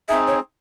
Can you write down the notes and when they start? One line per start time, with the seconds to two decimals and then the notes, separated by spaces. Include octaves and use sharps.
0.08 C4 D#4 G#4 E5
0.27 C#5